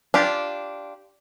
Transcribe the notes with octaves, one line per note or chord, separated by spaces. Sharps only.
D4 F4 G4